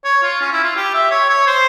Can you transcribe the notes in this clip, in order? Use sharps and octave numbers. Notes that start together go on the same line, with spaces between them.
C#5
F4
C#4
E4
F4
G4
E5
C#5
C#5
C5